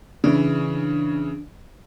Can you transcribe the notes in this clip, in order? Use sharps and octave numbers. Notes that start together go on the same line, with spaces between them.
C#3 E3 D4